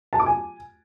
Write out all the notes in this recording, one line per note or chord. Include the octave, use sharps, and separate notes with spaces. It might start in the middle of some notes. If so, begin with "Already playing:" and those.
A5
D6
G#5